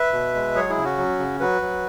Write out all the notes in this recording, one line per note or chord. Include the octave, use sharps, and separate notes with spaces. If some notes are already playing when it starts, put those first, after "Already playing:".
Already playing: B4 E5
B2
G#3
F#3 G#4 C#5
E4 G#4
C#3
C#4 F#4
F#3
C#3
F#3 F#4 B4
F#3